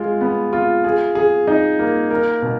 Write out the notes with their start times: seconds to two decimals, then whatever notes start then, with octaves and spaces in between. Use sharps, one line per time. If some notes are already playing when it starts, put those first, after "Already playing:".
Already playing: G#3 F4
0.21 B3
0.53 F4
0.84 G#4
1.15 G#4
1.47 D#4
1.79 A#3
2.11 A#4
2.42 B2